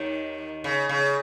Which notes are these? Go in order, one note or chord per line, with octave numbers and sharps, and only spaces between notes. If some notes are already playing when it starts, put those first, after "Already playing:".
Already playing: D#2 D#3
C#3
C#3